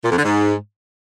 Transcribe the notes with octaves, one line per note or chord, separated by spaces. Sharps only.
A#2
F2
D3
G#2